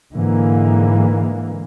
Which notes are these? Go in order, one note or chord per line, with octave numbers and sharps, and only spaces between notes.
G#2 D3 E3 A#3